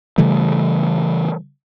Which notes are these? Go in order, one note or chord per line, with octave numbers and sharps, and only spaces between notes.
C#3 E3 G3 A3